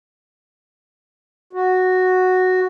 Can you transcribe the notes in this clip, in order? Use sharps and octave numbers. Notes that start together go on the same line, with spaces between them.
F#4